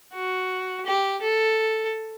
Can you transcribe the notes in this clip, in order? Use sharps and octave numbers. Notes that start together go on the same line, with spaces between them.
F#4
G4
A4